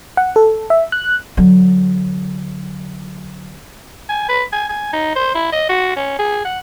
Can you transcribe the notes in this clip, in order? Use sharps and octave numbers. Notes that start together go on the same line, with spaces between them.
F#5
A4
E5
F#6
D3 F#3
G#5
B4
G#5
G#5
D#4
C5
E4
D#5
F#4
C#4
G#4
F#5